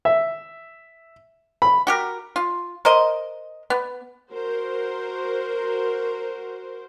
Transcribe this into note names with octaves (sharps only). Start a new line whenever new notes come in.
E5
B5
F#4 G4 A#4
F4
A#4 C5 D#5
B3
F#4 A#4 C5